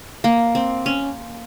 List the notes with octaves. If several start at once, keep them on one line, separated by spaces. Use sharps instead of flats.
A#3
C4
C#4